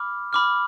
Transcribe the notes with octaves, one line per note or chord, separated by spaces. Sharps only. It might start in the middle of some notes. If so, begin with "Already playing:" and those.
Already playing: B5 D6 F6
B5 D6 F6